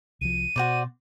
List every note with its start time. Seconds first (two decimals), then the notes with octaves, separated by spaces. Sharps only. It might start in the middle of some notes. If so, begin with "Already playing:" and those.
0.21 C2 F3 D#7
0.56 B2 F#4 C5 D5